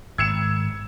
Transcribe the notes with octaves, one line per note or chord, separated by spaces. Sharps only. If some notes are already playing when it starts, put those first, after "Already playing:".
G#1 E6 G#6 C#7 E7